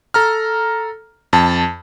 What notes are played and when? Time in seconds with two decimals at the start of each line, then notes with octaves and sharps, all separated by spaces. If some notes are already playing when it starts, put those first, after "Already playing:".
0.14 A4 A#5 F6
1.33 F2 A5